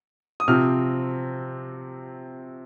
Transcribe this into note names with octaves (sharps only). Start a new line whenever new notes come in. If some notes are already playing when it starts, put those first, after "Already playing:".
D#6
C3 F3 C4 F6